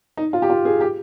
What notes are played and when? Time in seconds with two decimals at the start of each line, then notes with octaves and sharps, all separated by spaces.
0.17 D#4
0.33 F4
0.42 G4
0.50 F4
0.65 G#4
0.81 G4